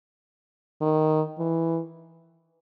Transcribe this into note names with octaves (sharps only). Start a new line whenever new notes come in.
D#3
E3